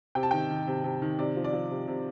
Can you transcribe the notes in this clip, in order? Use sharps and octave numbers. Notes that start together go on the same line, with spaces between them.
C3 G5
A5
D#3 G5
D#3
C3
C3
D#3
C3 D5
F3
D5
F3
C3
C3